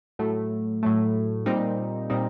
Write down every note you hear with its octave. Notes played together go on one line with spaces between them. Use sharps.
A2 F#3 A3
A2 F#3 A3
A#2 G3 C4 D#4
A#2 G3 C4 D#4